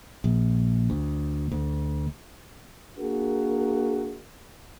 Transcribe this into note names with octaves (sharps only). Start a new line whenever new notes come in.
A#1
D2
D2
A#3 D4 F#4 G#4 A#4